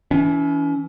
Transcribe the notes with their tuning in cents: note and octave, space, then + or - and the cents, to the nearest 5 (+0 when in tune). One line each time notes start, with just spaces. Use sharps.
E3 +0 C#4 +40